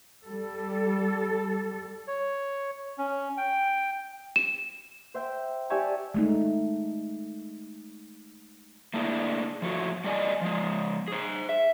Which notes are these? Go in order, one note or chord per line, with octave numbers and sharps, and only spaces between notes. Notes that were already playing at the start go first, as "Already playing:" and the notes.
G3 A4
C#5
C#4
G5
E7
C5 E5 G5
G4 D5 E5 G#5 A5 C#6
G#3 A3 D#4
A3 A#3 D4 E4 G#4
F3 A3 F#4
G3 A4 D5 D#5 G#5
F3 G#3
G#4 C5
E5